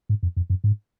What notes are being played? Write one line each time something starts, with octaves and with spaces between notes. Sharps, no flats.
G#2
F2
F2
F#2
G#2